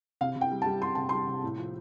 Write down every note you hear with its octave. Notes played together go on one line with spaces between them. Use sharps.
C3 F5
C3
G5
G3
A5
G3
G3 C6
C3 A5
G3 C6
C3
A2
F3